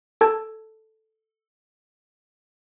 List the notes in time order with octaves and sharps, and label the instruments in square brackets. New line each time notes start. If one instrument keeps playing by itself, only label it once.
[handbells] A4 A5 G#6